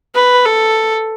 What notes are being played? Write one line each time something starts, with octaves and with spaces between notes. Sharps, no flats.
B4
A4